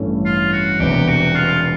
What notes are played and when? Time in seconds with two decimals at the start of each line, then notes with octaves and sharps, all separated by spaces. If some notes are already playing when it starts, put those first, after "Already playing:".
Already playing: A1 G2 E3 A3 C#4
0.25 F4
0.53 F#4
0.80 E1 E2 C3 G4
1.08 F#4
1.36 F4